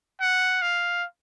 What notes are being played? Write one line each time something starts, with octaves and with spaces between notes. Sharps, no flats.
F#5
F5